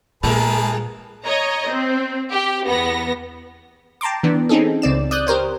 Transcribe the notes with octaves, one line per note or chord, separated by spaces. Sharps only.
A#2 G3 G#3 G#4 A#4 B4 A5
C#5 D#5 A#5
C4
G4
E2 B3 A#6
G5 A5 A#5 C6 D6
E3 B3 D4
C4 C#4 D#4 G#4 A4
C#2 C4 D5 E7
D5 D#6 F#6 G6
G4 A#4 C5 C#5